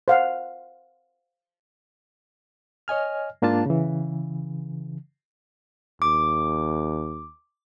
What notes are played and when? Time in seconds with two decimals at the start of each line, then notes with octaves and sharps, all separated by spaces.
0.08 C5 F5 F#5
2.88 C#5 D#5 G#5 F6
3.42 G#2 A#3 D4 F4 A5
3.66 C#3 E3
6.02 D#2 D6